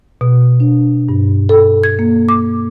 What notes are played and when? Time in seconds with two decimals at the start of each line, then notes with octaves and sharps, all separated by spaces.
0.21 B2
0.60 D4
1.09 G2
1.49 A4
1.84 G#6
1.99 A#3
2.29 D6